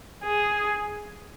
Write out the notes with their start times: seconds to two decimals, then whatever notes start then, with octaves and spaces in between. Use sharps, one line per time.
0.24 G#4